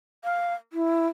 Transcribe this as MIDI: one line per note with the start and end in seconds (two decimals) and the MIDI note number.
0.24 0.54 77
0.73 1.07 64